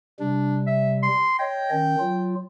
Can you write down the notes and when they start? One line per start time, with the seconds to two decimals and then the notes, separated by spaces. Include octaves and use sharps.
0.20 C3 G3 D4
0.67 E5
1.03 C6
1.39 C#5 D#5 G5
1.71 D#3 C#4
2.00 F#3 F4